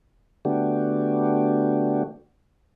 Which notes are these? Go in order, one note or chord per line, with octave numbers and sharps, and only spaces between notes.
D3 A3 B3 D4 F#4 G4